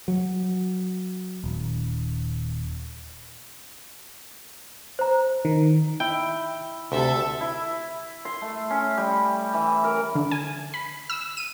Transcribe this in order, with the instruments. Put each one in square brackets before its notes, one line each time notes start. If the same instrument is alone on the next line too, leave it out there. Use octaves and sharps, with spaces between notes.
[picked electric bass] F#3
D#1
[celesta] C5 A#5
[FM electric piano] D#3
[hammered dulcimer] E4 [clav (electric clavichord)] G5
[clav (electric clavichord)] D2 [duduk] C3 [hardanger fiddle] A4 E5
[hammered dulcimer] E4
C6
A3
C#4
G3
E3
A#4
[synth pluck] D3
G#5
B5
E6
D#7